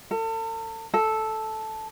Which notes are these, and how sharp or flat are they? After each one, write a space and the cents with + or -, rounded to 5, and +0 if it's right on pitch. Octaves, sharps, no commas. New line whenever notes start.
A4 +40
A4 -5